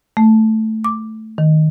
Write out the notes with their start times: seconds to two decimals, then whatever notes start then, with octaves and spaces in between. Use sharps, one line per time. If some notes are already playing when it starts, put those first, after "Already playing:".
0.17 A3
0.84 D6
1.38 D#3